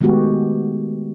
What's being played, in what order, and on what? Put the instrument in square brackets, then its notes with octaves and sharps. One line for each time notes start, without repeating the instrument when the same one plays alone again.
[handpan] D#3 G#3 A3 B3 F#4 G4